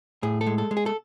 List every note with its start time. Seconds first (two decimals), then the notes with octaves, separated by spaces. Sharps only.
0.23 A2 G#4
0.41 A4
0.47 G#3
0.58 A4
0.71 G#3
0.77 G#4
0.86 A4